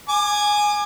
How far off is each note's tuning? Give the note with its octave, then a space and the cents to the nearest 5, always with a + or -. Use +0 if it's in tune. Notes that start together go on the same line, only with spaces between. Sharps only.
G#5 +0 D6 +40